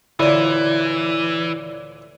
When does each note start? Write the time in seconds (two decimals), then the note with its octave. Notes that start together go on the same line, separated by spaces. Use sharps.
0.19 D2 A#2 E3 E4 C#5 D5